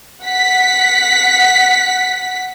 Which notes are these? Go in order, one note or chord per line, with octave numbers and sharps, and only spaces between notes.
F#5 B6